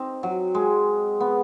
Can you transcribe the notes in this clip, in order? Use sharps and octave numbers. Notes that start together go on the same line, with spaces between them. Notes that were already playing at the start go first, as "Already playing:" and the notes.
Already playing: C4 D#4
F#3
G#3
B3